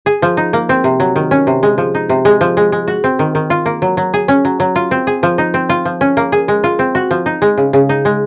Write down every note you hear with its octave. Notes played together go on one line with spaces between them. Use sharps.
G#4
F3
D#4
A#3
C4
C3
F#3
D#3
C#4
C3
G#3
F3
D#4
C3
G#3
F3
G#3
G#3
F#4
C4
D#3
D#3
F4
A#3
F#3
F#3
G#4
C#4
F#3
F#3
F4
C4
G#4
F3
D#4
C4
F4
F3
C#4
A#3
G#4
G#3
F4
C4
F#4
F3
D#4
G#3
C#3
C#3
D#4
G#3